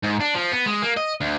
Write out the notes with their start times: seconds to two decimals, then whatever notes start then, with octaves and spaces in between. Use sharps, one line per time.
0.04 G#2
0.21 D4
0.35 F3
0.52 B3
0.66 G#3
0.82 A#3
0.97 D#5
1.21 D2